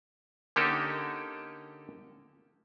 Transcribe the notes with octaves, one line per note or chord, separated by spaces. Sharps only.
D3 A#3 C#4 D#4 G4 A4